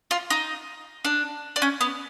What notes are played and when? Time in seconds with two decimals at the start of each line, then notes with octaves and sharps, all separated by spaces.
0.11 F4
0.30 D#4
1.05 D4
1.56 D4
1.62 C#4
1.81 B3